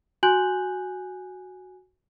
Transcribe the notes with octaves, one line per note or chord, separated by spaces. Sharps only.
F#4 G#5 F#6 G6 F#7